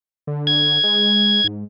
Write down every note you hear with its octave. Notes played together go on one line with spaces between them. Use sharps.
D3
G#6
G#3
G#2